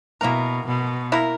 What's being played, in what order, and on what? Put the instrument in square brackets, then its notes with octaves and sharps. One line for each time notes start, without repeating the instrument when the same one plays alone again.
[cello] B2 [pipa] A#3 E4 A#4
[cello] B2
[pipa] A#3 E4 A#4